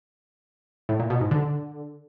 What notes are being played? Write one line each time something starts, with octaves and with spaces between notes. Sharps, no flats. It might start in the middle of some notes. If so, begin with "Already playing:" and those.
A2
A#2
B2
G#2
D3